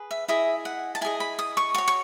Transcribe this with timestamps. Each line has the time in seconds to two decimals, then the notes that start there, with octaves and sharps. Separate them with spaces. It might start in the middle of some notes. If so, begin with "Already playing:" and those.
Already playing: G#4 B4
0.11 E5
0.28 E4 G#4 D#5 E5
0.65 F#5
0.95 A5
1.01 E4 G#4 D#5 G#5
1.20 B5
1.39 D#6
1.57 C#6
1.75 F#4 C#5 C#6
1.88 C#6